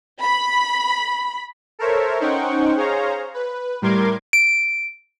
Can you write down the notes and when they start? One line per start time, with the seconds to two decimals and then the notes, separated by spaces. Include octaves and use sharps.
0.23 B5
1.79 A4 A#4 C5 C#5 E5
2.20 C#4 D#4 C5 F#5 G5 C#6
2.76 G#4 C5 C#5 F5 A#5
3.34 B4
3.82 A2 G3 A#4 C6 D6 G#6
4.33 D7